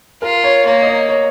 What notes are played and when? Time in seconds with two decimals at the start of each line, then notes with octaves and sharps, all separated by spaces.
0.22 F4 A#4
0.44 C#5
0.66 A#3 C#5
0.82 D#5
0.87 C#5
1.09 C#5